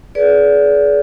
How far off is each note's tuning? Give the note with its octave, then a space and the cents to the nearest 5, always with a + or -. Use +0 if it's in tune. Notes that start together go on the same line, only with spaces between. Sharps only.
G#4 +30 B4 -15 D5 -30